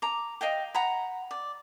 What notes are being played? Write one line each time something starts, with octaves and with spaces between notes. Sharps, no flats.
A#5 D6
D#5 F5 G5
F#5 A#5 B5
D5